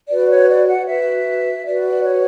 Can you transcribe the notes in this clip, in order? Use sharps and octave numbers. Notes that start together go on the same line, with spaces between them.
F#4 B4 D5
C#5
D5
F#5
F#4 B4 E5
F#4 B4 D5
C#5